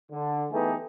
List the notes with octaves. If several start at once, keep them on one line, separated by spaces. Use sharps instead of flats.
D3
E3 A3 B3 D#4 G4 G#4